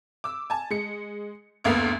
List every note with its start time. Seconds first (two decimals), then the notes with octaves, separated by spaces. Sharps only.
0.24 D6 E6
0.50 G#5 A5
0.70 G#3 C#7
1.64 F#1 D2 A#3 B3 A#4